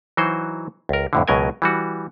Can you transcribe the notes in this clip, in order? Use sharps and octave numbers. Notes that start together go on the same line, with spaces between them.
E3 F#3 D#4 F#4 C5
C#2 A#4
F2 A2 D3
C#2 B2 F#3 A#4 D#5 G#5
E3 G3 F#4